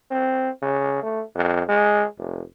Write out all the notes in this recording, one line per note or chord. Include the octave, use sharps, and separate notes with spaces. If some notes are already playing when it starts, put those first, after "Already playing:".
C4
C#3
A3
F2
G#3
F1